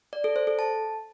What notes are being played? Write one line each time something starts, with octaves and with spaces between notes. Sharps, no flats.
D5
A4
C5
A4
A5